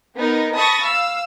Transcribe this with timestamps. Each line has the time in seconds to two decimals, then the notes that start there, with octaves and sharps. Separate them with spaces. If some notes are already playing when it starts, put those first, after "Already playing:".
0.17 B3 D#4 A#4
0.57 A5 B5 C#6 D#6 A6 A#6
0.86 F5 E6